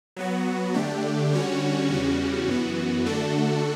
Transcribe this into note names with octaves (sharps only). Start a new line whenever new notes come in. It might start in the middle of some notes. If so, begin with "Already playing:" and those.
F#3 B3 F#4
D3 A3 D4 G4
D3 G3 C#4 F#4 C#5
E2 C#3 G3 C#4 F#4
F#2 E3 B3 F#4
D3 A3 D4 F#4 A4